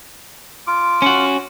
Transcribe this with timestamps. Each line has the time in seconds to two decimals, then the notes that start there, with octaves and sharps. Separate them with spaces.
0.67 F4 D6
1.02 C#4 F#4